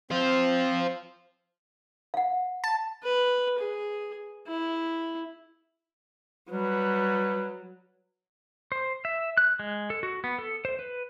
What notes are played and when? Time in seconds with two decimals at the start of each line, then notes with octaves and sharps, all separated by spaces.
0.11 C4 C5 F5
2.14 F5 F#5
2.64 A5
3.03 B4
3.59 G#4
4.47 E4
6.50 F#3 G3 B4
8.72 C5
9.05 E5
9.37 F#6
9.59 G#3
9.90 A4
10.03 F#4
10.24 B3
10.39 A4
10.65 C5
10.79 B4